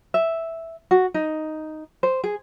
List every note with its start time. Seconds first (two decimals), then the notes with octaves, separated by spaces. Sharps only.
0.14 E5
0.91 F#4
1.14 D#4
2.03 C5
2.24 G#4